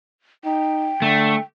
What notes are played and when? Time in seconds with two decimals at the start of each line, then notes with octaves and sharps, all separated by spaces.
0.45 D#4 G5
1.02 D3 A3